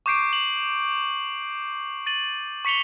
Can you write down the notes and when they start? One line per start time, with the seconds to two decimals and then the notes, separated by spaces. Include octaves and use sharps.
0.06 C#6 D6 G6 C7 D7
0.33 F#7
2.07 A6 D#7 F#7
2.65 C#6 B6 C#7 F7 G7